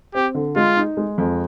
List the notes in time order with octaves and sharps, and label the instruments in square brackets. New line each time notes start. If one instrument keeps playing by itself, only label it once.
[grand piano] C4 [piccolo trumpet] G4
[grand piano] D3
[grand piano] G#3 [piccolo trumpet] F4
[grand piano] D#4
G#3
F2